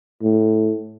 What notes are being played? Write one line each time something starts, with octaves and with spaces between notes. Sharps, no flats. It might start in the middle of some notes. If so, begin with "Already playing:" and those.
A2